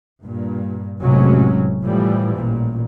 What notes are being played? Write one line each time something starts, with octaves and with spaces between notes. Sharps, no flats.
G2 A#2
F1 A2 C3 F#3 G#3 C#4
A2 E3 F3 G3
A1 A#2